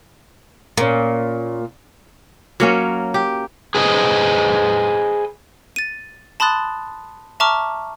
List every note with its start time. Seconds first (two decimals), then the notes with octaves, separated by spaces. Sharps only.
0.77 A#2 A#3 C#4
2.60 F#3 A#3 C#4
3.14 G4
3.75 G#4 B4 C5 D#5
5.76 A6 D#7
6.40 A5 B5 C6 D#6 F#6 A6
7.40 E5 A5 A#5 C#6 D6 F6